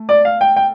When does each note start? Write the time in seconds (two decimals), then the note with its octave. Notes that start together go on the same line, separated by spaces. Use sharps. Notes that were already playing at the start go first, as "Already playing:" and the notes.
Already playing: A3
0.09 D5
0.25 F5
0.41 G5
0.56 G5